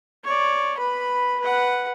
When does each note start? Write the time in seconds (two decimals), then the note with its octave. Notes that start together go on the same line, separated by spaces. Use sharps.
0.25 C#5 D5
0.77 B4 B5
1.40 B4 F#5